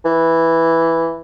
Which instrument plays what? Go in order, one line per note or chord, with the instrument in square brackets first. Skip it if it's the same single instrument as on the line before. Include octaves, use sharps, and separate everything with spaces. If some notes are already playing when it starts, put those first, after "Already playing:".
[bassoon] E3